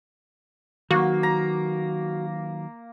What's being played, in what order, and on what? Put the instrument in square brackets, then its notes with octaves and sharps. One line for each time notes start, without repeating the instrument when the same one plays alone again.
[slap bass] D#3 F#3 [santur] A#3 [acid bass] F#4
[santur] A#5